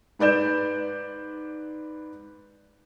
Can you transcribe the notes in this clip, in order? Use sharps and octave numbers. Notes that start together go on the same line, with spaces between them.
G#2 B4 D5 G6 E7